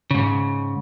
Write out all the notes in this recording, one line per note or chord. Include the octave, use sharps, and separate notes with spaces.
G#2 C#3